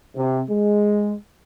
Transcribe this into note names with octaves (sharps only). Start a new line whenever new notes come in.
C3
G#3